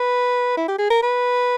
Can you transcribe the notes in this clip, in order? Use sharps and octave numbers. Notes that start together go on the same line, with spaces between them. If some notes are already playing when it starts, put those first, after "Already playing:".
Already playing: B4
E4
G4
G#4
A#4
B4